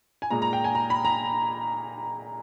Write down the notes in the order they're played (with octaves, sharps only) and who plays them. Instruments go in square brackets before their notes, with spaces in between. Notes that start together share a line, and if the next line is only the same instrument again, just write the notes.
[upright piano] G#5
A#2 G#3 A#5
A#5
G5
G#5
A#5
B5
A#5